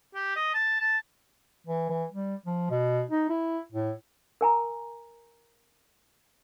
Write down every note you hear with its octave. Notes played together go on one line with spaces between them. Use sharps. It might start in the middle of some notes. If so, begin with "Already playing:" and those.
G4
D#5
A5
A5
E3
E3
G3
F3
B2
D#4
E4
A2
A#4 G#5 A#5